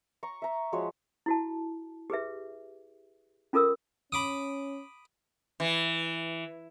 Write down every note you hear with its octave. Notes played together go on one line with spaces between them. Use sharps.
A#5 C#6
E5 A#5
F3 G#3 F#4 C#5
E4 F#4 A5
G4 G#4 B4 E5
C#4 F4 A4 A#4 D#6 E6
C#4 B5 D6 D#6
E3